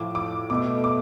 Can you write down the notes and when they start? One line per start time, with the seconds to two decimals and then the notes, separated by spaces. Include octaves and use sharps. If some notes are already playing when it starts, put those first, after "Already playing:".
Already playing: A2 F3 A3 D6
0.15 D6
0.50 B2 A3 D6
0.84 D6